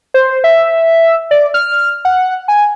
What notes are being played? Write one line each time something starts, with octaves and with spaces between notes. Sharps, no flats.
C5
E5
D5
F6
F#5
G#5